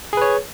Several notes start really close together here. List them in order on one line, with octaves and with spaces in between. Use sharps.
G#4 B4 C#5